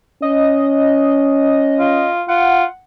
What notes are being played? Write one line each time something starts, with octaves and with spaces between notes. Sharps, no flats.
C#4 D#5
F4
F4 F#5